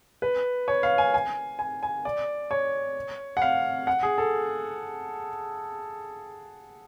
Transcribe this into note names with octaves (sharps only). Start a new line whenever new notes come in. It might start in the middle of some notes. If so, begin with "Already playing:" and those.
B4
C#5
F5
G#5
G#5
G#5
G#5
D5
C#5
F#5
F5
F#5
G#4
A4